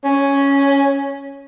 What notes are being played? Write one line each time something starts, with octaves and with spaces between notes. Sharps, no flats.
C#4